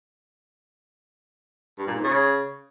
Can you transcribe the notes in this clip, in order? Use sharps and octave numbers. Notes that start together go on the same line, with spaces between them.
G2
A#2
G#2
C#3